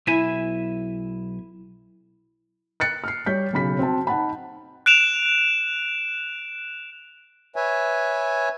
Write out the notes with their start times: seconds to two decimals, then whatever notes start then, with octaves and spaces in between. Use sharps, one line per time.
0.07 B1 E4 E5 G#5
2.80 F#6 A6 C#7
3.04 F6 C7
3.26 G3 C#5 G6 B6
3.53 B1 C#3 B5 B6
3.79 C4 F#4 A5
4.07 D#4 F#5 A5 B5
4.86 F#6 D7 E7 F7
7.56 B4 C#5 E5 G#5